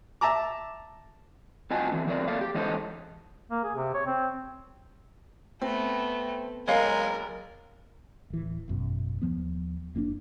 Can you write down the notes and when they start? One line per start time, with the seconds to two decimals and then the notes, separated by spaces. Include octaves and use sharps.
0.21 E5 A5 A#5 D6
1.70 C4 F4 F#4 D#5 G#5 A5
1.92 E3 C4
2.07 F3 F#3 C4 A#4 D5
2.28 A#3 A4 D5 F5
2.41 G4
2.54 E3 G#3 C#4 D#4 A4 C5
3.51 A#3
3.64 G#4
3.76 C3
3.94 C#5
4.07 C4
5.62 A3 B3 C4
6.68 F#1 G#3 A#4 C#5 F5
8.30 D1 E3
8.68 G#1 F#2 B2
9.22 D#2 F3 B3
9.95 F#1 A#3 C#4 D4